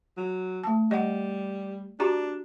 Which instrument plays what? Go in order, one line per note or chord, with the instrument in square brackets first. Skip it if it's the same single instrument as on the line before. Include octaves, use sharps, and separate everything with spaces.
[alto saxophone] F#3
[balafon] A3 A5
[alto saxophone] G3 [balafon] D#5 F#5
[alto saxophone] D4 [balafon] F#4 G4 A#5